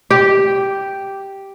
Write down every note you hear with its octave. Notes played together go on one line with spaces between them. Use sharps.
G4